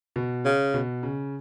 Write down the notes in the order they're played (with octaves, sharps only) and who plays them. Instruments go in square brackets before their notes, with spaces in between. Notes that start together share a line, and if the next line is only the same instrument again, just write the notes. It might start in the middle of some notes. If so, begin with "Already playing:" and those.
[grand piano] B2
[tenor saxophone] C#3
[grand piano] B2
C#3